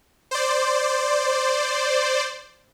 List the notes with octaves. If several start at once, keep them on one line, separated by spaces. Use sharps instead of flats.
C5 D5